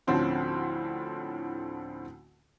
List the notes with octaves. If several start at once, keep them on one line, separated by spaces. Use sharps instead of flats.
D2 A2 D3 F3 C4 C#4